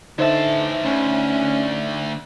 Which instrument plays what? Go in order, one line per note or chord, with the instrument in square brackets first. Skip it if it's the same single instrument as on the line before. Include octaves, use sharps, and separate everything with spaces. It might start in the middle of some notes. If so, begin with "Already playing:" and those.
[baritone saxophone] D3 [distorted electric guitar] E3 A5 [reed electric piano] D#4 C5 E5
[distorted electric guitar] D2 [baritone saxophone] C#4